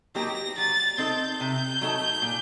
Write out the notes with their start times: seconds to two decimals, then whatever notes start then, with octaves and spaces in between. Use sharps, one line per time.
0.15 F#3 A#3 D#4 G4 A#6
0.58 F#3 A6
0.98 C4 D#4 A4 G6
1.40 C3
1.81 F#3 A3 D#4 A4
2.22 A#2